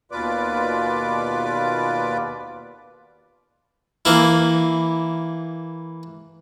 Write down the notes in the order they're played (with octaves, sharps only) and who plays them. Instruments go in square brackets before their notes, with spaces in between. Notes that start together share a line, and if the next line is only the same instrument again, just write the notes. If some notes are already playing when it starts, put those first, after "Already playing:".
[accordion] D#2 B2 F4 B4 D5 D6
[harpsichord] E3 A#3 E4